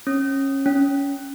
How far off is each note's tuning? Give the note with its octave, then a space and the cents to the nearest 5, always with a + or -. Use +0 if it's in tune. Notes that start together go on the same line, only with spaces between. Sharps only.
C#4 -20
C#4 +15